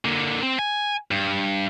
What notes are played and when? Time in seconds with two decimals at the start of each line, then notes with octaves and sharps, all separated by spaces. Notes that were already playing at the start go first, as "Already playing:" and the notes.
0.05 D3 A#3
0.43 C4
0.59 G#5
1.11 G2